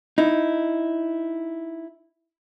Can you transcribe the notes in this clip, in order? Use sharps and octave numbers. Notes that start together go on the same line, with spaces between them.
D#4 E4